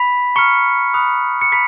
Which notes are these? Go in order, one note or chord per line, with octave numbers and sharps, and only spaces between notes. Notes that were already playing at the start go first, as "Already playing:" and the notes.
Already playing: B5 B6
A#5 C#6 F6 C#7
B5 D#6 F#6
C#7
A#5 B5 B6